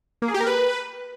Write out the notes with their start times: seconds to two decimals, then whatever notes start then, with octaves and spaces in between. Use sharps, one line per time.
0.22 A#3
0.28 G#4
0.34 G4
0.40 A#4
0.46 B4